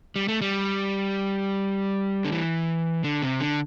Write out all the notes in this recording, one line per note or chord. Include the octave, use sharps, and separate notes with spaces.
G3
A3
G3
D3
E3
D3
C3
D3